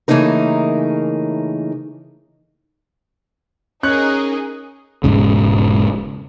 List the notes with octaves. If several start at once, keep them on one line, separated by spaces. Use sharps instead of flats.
C#3 E3 A3 A#3 D#4 A#4
C#4 D#4 G#4 A#4 F#6
E1 A#1 G#2 C#3